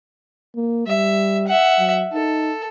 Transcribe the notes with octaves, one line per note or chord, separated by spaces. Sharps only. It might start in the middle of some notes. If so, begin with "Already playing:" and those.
A#3
G3 E5
E5 F#5
F#3
D#4 A4